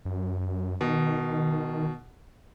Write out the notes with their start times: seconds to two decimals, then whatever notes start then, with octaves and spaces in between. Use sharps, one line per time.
0.05 F#2
0.81 B2 D#3